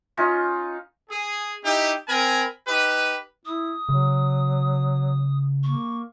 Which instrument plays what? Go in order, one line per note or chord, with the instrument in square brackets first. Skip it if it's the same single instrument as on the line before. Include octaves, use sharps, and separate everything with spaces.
[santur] C#4 D#4 F4
[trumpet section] G#4
D#4 E4 G4
C4 A#4 G#5 B5
D#4 G4 B4
[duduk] E4 [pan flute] D#6
[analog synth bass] C#3 [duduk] F#3
[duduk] A#3 [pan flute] C#6